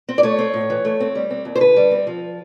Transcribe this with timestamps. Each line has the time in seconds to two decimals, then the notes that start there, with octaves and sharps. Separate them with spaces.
0.08 C4
0.18 D5
0.23 A3 C#5
0.39 C4
0.54 A2
0.70 E3
0.85 A3
1.00 C4
1.15 G3
1.30 C4
1.45 D#2
1.56 C5
1.60 D3 B4
1.76 G3
1.91 C4
2.07 F3